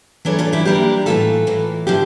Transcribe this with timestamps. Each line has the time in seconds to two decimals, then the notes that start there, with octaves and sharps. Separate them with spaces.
0.25 E3 G3 A#3 D4 A4 C#5
0.39 F4 A4
0.53 E4 G4
0.65 E3 G3 A#3 D4 G4 A#4
1.06 A2 E3 A#3 F4 A4
1.47 A2 E3 A#3
1.87 D3 F3 E4 G4